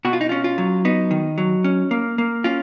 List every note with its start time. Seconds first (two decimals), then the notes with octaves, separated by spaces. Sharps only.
0.05 B2 F#4
0.13 F4
0.21 D#4
0.29 C#4 F4
0.44 F4
0.58 F#3
0.85 B3 D#4
1.11 D#3
1.38 F#3
1.64 C#4
1.91 A#3
2.18 A#3
2.44 C#4 F4